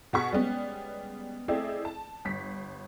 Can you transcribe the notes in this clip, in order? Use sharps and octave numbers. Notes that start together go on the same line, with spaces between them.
B2 F#4 G#4 C#6 B6
G3 G#3 B3 C#4
A3 C4 E4 G#4 D5 D#5
A5
G1 B6